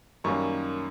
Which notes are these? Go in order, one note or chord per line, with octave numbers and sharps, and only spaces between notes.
F#2 D#3 G3 A#3 C#4 C#6